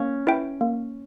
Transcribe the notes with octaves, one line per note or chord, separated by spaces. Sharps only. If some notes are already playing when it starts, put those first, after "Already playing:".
Already playing: A#3 C#4
E4 B4 E5 G5
A#3